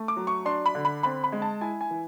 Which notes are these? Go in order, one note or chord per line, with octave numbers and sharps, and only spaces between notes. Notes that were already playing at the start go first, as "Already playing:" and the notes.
Already playing: A3
D6
F#3
C#6
D4 C6
B5
D3
B5
C4 B5
B5
G#3
A5
E4 G#5
G#5
E3